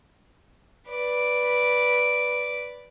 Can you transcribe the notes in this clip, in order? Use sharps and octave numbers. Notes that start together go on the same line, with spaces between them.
B4 D5